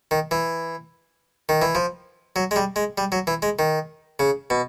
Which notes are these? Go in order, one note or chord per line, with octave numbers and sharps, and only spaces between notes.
D#3
E3
D#3
E3
F3
F#3
G#3
G3
G#3
G3
F#3
E3
G#3
D#3
C#3
B2